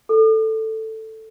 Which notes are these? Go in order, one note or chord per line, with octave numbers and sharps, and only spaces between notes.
A4